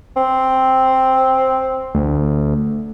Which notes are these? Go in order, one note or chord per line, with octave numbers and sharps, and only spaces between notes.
C4
D2